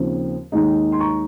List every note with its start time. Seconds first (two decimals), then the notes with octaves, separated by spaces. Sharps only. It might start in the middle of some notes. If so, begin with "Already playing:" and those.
Already playing: D#2 C#3 F3 C4
0.52 D#2 D#3 G#3 D#4
0.92 C6
0.99 A#5 C#6